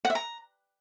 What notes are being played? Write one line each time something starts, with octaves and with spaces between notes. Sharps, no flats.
F#5
E5
A#5